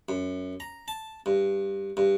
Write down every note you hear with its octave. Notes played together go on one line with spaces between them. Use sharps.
F#2
A#5
A5
G2
G2